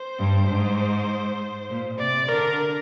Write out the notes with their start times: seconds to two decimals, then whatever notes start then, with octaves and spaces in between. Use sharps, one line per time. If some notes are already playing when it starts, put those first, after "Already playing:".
Already playing: C5
0.18 G2
0.48 G#2
1.69 A#2
1.99 C3 D5
2.29 D3 A#4